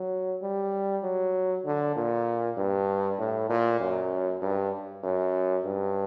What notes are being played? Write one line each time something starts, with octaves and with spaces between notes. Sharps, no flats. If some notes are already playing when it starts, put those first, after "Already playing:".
Already playing: F#3
G3
F#3
D3
A#2
G2
A2
A#2
F#2
G2
F#2
G2